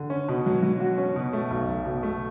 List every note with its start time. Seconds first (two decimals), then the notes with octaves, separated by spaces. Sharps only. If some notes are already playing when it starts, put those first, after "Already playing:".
Already playing: D3
0.10 C#4
0.28 B2
0.46 F#3
0.62 F#3
0.80 F#4
0.98 C#4
1.16 B2
1.33 A3
1.51 B1
1.68 B1
1.85 B2
2.03 A3